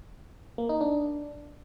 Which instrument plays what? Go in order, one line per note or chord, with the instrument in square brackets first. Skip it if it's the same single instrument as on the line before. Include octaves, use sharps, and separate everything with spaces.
[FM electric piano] A#3
D#4
D4